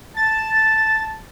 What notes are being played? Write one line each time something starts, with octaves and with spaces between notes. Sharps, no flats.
A5 A6